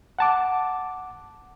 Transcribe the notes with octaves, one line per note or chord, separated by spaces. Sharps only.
F#5 A5 D6